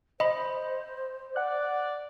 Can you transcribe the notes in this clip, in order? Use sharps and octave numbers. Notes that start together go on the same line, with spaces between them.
C5 D#5 B5
D5 F#5 F#6